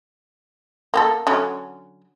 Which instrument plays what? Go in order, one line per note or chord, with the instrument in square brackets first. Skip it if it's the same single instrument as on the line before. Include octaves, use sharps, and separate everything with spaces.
[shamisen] A#3 G4 A4
D3 F#3 C#4